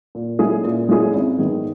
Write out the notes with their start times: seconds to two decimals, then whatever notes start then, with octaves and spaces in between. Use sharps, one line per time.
0.15 A#2
0.39 G#3 C#4 E4 G#4
0.64 A#2
0.89 G#3 C#4 E4 G#4
1.13 G#1
1.38 G#2 D#3 G#3 B3